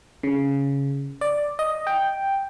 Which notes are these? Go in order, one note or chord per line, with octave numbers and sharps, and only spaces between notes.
C#3
D5
D#5
G5